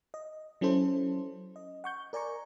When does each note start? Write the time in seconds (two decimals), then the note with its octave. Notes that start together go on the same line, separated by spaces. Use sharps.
0.14 D#5
0.61 F#3 C#4 E4 A4 C5
1.56 D#5
1.84 F#5 C#6 G6
2.13 A#4 D5 G#5 A#5 C#6